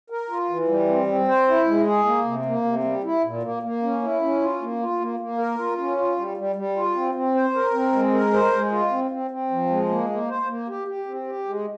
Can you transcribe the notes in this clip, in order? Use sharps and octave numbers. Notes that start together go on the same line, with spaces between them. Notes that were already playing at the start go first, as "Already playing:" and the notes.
A#4
F4
E3
G3
C4
C4
C5
E4
G#3
G#4
A#3
C3
A#3
C3
G3
E4
A#2
A#3
A#3
C#4
E4
C#4
F4
A#3
F4
A#3
A#3
A#4
F4
C#4
F4
G3
G3
G3
F4
C4
C4
C5
A#4
C4
G#3
A#4
C5
G#3
F4
C4
C4
C4
F3
G#3
A#3
A#3
C5
A#3
G4
G4
C4
G4
G#3